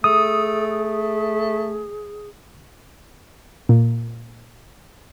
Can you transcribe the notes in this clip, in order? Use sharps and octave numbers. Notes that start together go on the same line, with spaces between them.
A3 G#4 D#6
A#2